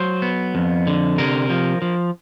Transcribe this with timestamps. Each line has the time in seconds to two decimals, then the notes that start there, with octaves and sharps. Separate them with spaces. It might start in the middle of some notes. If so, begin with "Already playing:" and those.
Already playing: F#3 C5
0.22 B3
0.55 F2
0.87 D3
1.18 C3 A#4
1.50 F3
1.82 F3